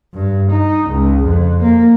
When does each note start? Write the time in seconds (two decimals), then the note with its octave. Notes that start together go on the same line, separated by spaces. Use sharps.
0.14 G2
0.51 D#4
0.90 C#2
1.25 F2
1.63 A#3